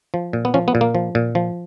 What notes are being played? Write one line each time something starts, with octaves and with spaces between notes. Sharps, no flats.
F3
A#2
B3
F3 C#4
B3
A#2
A#3
F3
A#2
F3